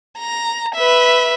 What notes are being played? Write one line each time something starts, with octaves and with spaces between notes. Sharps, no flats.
A#5
B4 E5